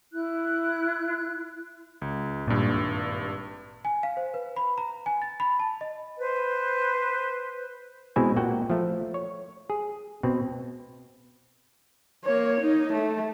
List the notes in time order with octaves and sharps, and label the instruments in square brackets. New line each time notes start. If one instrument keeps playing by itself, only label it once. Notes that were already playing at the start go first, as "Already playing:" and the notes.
[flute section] E4 F#6
[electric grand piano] C#2
[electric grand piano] G#1 G2 [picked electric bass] A#2
[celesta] G#5
F5
C5
B4
B5
A#5
G#5
A6
B5
A5
D#5
[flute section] B4 C5
[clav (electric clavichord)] B2 G#3 C4 E4 E5 G#5
A#2 F#4 F#5 G5
F3 A3
C#5
G#4
B2 C4
[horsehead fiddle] A#3 C#5
D#4
A3